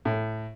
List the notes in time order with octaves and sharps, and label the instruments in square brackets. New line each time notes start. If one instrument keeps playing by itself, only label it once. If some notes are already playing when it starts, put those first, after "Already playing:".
[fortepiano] A2